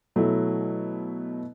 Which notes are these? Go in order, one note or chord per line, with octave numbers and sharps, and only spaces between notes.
B2 F#3 A3 E4